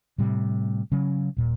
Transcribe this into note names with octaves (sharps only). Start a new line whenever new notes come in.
A2 C3 G3
C#3 F#3 C#4
D#1 A#2